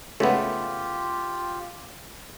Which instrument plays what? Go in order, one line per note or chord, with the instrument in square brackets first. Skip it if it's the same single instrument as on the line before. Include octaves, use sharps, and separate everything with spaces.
[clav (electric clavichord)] C#3 B3 [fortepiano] A3 E5 [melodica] F4 G4